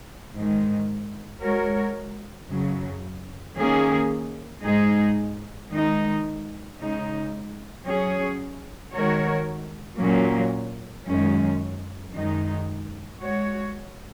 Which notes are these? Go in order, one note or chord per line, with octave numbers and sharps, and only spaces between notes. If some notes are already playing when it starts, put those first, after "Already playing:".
G#2 D#3 G#3
G#3 F#4 A#4 C#5
F#2 C#3 F#3
D#3 A#3 C#4 G#4
G#2 G#3 D#4 G#4
D#3 G#3 D#4
C#3 G#3 D#4
F#3 C#4 G#4 C#5
D#3 G#3 F#4 A#4 C#5
A#2 F#3 A#3 C#4
F#2 D#3 G#3 C#4
F#2 D#3 G#3 D#4
G#3 F#4 C#5